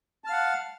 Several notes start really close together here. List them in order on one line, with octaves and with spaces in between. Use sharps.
A5 F6 F5 F#5